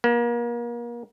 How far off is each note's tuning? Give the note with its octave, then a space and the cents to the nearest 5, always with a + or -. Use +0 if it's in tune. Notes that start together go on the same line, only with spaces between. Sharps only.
A#3 +35